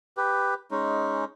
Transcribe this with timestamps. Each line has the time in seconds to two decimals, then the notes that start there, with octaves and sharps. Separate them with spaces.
0.17 G4 B4
0.71 G#3 C#4 D#4